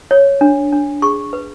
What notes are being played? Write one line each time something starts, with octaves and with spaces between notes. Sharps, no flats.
C#5
D4
D4
G#4 C#6
B4